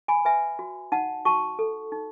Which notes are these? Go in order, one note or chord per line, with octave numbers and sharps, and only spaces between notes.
G#5 B5
B4 E5 G#5
F#4
D#4 F#5 A5
F#4 A5 C#6
A4
D#4